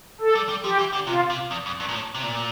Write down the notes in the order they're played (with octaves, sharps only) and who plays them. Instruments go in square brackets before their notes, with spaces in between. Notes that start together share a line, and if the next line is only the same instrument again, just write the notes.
[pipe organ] A4
[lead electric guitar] G3
G3
[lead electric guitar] F3 [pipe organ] G4
[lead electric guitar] E3
D3
[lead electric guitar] C3 [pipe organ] F4
[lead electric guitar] C3
E2
F2
G2
A#2
A2
C3
A#2